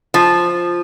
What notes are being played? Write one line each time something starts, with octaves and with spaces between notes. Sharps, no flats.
F3